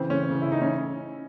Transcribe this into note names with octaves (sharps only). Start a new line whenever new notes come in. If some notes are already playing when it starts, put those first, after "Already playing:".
Already playing: C#3 E3 C4
C#4
C#3 E3
E4
D#4
C#4